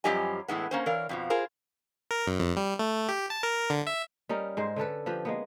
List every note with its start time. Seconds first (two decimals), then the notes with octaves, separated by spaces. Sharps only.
0.04 F#2 F3 G3 G4 D#5 G#5
0.48 A2 E3 G#3 B3
0.71 A#3 C#4 C5
0.86 E3 A#4 C#5 D5 F5
1.09 F2 B2 F3
1.30 F4 G#4 A#4 C5
2.11 A#4
2.27 F#2
2.39 F2
2.56 G3
2.79 A3
3.08 G4
3.30 A5
3.43 A#4
3.70 D3
3.87 E5
4.29 G3 C#4 D#4 A#4
4.57 G#2 G#3 C5
4.76 D3 C#4 A4 B4
5.06 F3 G4 B4
5.25 G#3 A#3 B3